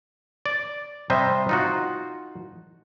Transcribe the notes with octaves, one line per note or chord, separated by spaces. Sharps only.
D5
C3 G3 C5 D#5 E5
D#4 F4 F#4